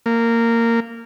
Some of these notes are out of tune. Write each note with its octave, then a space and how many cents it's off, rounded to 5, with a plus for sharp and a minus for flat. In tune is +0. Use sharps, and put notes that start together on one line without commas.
A#3 -15